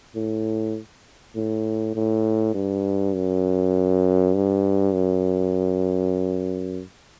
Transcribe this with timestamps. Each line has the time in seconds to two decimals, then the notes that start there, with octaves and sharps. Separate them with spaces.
0.16 A2
1.35 A2
1.95 A2
2.55 G2
3.15 F#2
4.35 G2
4.94 F#2